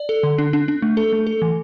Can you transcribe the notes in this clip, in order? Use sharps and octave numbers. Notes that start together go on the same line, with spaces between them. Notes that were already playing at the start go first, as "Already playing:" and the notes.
Already playing: D5
A4
D3
D4
D4
D4
A3
A4
A3
A4
E3